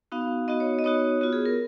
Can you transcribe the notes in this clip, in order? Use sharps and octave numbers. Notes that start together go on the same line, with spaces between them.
B3 D#4 F#4 F5
B3 D#4 F#4 D#5
C#5
D#5
B3 D#4 F#4 C#5
B3 F4 F#4
G#4
A#4